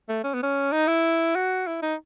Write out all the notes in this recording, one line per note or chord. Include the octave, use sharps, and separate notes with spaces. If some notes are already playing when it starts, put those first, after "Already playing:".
A3
C#4
B3
C#4
D#4
E4
F#4
E4
D#4